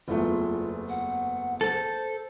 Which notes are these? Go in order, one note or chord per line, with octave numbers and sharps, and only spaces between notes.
F#1 E2 A3 F4
F#5
A4 C5